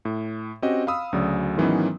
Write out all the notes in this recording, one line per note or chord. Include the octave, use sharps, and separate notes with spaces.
A2
C4 C#4 F#4 G4 D#5
F5 B5 D#6 E6
D2 C#3 F#3 D5
G#2 D#3 E3 F#3 B3 C#4